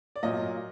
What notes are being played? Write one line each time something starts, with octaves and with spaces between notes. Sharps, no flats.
D5
A#2 F#3 A#3 D#5